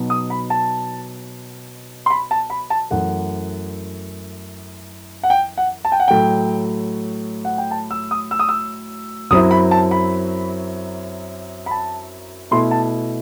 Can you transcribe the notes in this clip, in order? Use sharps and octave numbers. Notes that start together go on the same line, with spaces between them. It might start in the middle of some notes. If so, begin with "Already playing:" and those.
Already playing: B2 F#3 B3 D#4
D#6
B5
A5
C6
B5
A5
B5
A5
F#2 E3 A3 F#5
F#5
G5
F#5
A5
G5
F#5
A2 F#3 A3 G5
F#5
G5
A5
E6
D#6
E6
D#6
E6
F#2 F#3 C4 E4 D#6
B5
A5
B5
B5
A5
B2 A3 E4 C6
A5